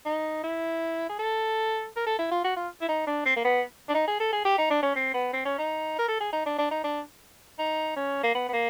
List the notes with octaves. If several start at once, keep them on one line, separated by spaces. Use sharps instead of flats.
D#4
E4
G#4
A4
A#4
A4
E4
F4
F#4
F4
E4
D#4
D4
C4
A#3
B3
D4
D#4
G#4
A4
G#4
G4
D#4
D4
C#4
C4
B3
C4
C#4
D#4
A#4
A4
G#4
D#4
D4
D4
D#4
D4
D#4
C#4
A#3
B3
B3
A#3